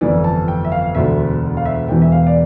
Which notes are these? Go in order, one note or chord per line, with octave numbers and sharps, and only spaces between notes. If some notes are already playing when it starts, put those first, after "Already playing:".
G1 F2 E3 D5
A5
G5
E5
F5
E1 D2 D3 E5
F5
E5
E1 E2 E3 G5
E5
F5
D5